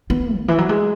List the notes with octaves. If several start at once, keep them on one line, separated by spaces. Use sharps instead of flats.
B3
C#3
E3
F#3
G#3